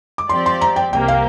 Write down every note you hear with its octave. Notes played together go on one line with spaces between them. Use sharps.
D6
F3 C4 G4 D5 C6
C6
A#5
G5
C2 C3 A#3 G4 G5
F5